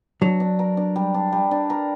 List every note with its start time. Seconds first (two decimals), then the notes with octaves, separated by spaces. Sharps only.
0.21 F#3 D4
0.40 D4
0.59 A#4
0.77 D4
0.96 G3
1.14 D4
1.33 G3
1.51 D4
1.70 A#4